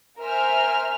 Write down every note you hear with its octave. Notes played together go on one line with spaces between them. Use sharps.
A#4 C5 E5 G#5 F6